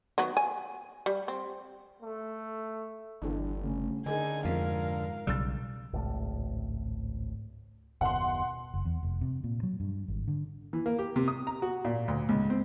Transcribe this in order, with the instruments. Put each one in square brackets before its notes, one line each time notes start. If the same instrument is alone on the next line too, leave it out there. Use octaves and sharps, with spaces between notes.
[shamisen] D#3 F#3 B3
G#5
G3
C4
[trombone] A3
[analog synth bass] G1 [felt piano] E3 D4 A4
[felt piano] C#3 A3 C#4
[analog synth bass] D3 [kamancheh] D#4 G#5 [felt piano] G#4 A#4 D#5
[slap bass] F2 [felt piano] G#2 F3 [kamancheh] A#4 F5
[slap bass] B1 C#3 G3 [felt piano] E6 F6 A6
[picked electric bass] G#1 C#2 A2
[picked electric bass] F#1 D#2 B2 [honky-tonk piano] F#5 C6
[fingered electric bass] F#1
E2
F1
C3
A#2
F#3
G2
G#1
D3
[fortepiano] E3
A#3
G4
C3
D#6
A#5
F#4
A#2
D2
C#2
C4